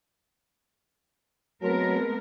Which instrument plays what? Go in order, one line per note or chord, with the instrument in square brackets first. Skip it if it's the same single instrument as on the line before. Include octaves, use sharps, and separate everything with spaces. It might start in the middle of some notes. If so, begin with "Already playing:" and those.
[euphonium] F#3 [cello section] G#3 B3 A#4 [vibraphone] A3 C4 B4